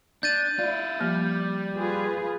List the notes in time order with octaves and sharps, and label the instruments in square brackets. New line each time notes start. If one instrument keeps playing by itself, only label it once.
[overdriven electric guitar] D4 [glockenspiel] G6 A6 D#7
[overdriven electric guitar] E4 F4 [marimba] D5
[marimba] F3 A#3 F6 [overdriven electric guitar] G3
[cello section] F4 G#4 B4